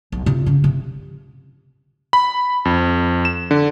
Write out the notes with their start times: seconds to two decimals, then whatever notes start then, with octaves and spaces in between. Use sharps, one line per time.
0.12 B1
0.26 C3 F4
0.46 C#3
0.64 C3
2.13 B5
2.65 F2
3.25 E7
3.51 D3